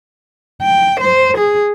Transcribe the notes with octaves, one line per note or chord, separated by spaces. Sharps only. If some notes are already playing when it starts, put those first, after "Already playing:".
G5
C5
G#4